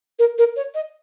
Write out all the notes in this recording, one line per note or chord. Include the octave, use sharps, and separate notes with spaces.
A#4
A#4
C#5
D#5